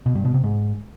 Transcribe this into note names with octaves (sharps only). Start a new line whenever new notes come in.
B2
G2
B2
C3
G#2